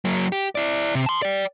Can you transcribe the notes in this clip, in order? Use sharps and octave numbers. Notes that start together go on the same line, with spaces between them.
F#3 A#3
G4
E4 D5
C3
A5 C6
D5 G5